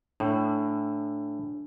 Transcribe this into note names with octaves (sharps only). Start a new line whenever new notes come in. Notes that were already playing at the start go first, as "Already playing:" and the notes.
A2 D4